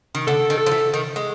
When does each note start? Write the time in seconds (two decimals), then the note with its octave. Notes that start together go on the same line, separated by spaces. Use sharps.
0.15 D#3
0.27 D3 A4
0.50 D#3
0.57 A4
0.66 F3
0.71 E3
0.94 D#3
1.16 G#3